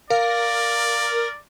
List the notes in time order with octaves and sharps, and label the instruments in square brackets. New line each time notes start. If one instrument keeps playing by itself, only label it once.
[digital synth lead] A#4 [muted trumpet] D5 [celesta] F5